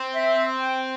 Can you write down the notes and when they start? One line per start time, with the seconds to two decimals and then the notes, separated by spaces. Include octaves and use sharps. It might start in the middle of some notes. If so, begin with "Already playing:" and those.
Already playing: C4
0.14 E5
0.60 G5